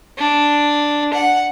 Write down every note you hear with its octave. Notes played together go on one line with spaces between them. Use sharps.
D4
F#5